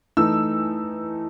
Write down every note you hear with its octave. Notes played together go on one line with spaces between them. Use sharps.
E3 A3 D#4 E6